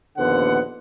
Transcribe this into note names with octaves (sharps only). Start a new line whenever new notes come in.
A#1 D#2 D3 B3 C5 F#5